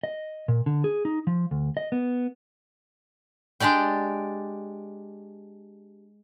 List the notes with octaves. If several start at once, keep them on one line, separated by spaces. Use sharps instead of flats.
D#5
A#2
D3
G#4
D#4
F3
D2
D#5
B3
G#3 D4 G4 D5 G5